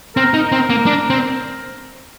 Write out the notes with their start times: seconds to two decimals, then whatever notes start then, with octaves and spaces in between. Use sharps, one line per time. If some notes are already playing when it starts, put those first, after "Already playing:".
0.16 C4 A#4
0.34 D#4
0.52 C4
0.70 A#3
0.86 D4
1.10 C4